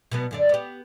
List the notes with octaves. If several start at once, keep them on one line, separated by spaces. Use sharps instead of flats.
B2 F#3 B3
F#2 D3 D5
B3 G4